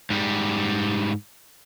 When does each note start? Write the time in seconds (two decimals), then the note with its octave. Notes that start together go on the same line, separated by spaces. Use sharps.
0.10 G#2 G3